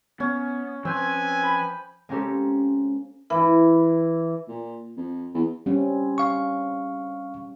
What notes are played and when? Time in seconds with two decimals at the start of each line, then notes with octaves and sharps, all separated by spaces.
0.20 B3 C#4
0.85 F3 C4 C#4 B4 G5 G#5
1.43 B5
2.09 G#3 A#3 C4 C#4 G4 A4
3.30 E3
4.48 A#2
4.97 F2
5.34 E2
5.66 G3 C4 C#4
6.18 F5 C#6